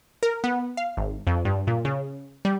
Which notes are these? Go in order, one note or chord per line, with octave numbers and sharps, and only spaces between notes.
A#4
B3
F5
G#1
F2
G2
A#2
C#3
G3